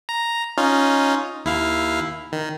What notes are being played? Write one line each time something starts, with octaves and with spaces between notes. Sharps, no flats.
A#5
C#4 D#4 F4
D#2 E4 F5
D#3